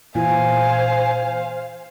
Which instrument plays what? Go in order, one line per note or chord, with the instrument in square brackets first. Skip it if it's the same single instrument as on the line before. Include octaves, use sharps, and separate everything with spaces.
[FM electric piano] A#2 E3 [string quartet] C5 F5 [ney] G#5